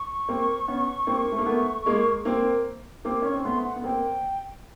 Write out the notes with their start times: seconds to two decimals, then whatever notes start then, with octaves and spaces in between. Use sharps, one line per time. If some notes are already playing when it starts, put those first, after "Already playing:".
Already playing: C#6
0.28 A#3 C4
0.68 B3 C#4
1.07 A#3 C4
1.32 A3
1.38 A#3
1.46 A3 B3
1.86 G#3 A#3
2.25 A#3 C4
3.05 A#3 C4 D6
3.22 C#4 C#6
3.33 C4
3.45 A3 B3 C6
3.64 F#5
3.76 B3
3.84 A#3 C4 G5